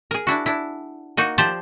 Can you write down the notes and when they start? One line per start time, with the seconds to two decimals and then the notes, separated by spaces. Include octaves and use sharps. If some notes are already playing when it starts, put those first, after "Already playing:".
0.11 G#4 A#4
0.27 D4 E4 F#4
0.46 D4 E4
1.17 A#3 D#4 F#4
1.38 F3 G4 C5 D5 A5